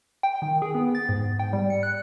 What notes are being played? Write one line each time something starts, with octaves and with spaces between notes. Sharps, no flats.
G5
D#3
G#4
B3
A6
G#2
G5
G3
C#7
F#6